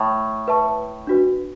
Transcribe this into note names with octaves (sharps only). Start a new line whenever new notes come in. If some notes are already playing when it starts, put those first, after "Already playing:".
Already playing: A2
B4 E5 A5 C#6
D4 F#4 B4